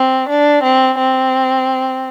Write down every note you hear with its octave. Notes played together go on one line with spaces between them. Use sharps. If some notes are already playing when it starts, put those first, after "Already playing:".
Already playing: C4
D4
C4
C4